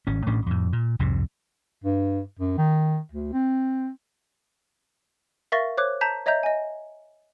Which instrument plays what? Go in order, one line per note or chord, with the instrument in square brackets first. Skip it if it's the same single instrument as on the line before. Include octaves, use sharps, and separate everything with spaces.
[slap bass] G#1 C#4
A1 A2 C#4 D4
F2 A2
A#2
C2 F2 G#2 C3
[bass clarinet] G2
F#2
D#3
D2
C4
[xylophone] A#4 E5 F5 C#6 A6 A#6
C5 C#5 D6 F#6
A5 A#5 G6 B6
C#5 D#5 E5 A#5 G6
D#5 G#5